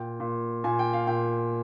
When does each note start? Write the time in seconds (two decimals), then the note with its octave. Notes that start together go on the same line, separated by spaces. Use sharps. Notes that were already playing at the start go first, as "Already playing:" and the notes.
Already playing: A#2 G5
0.20 A#2
0.64 A#2 G#5
0.79 G5
0.93 F5
1.07 A#2 G5